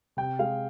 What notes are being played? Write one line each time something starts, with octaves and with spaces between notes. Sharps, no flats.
C3 G5
G#3 F5